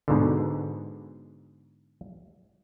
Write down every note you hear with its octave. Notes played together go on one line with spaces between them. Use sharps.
G#2 B2 D3